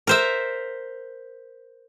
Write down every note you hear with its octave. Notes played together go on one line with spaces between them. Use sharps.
A#4 C5 E5